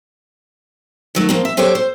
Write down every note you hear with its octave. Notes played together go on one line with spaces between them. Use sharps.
D#3 F#3 A3
F3 A#3 C4
E5
F#3 G4 A4 C5 C#5 G5
C5